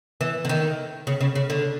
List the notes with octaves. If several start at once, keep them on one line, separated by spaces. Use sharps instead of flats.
E3
D3
D#3
C#3
C#3
C#3
D3